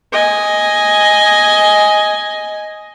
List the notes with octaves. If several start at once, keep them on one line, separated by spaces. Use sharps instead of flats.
D#5 G#5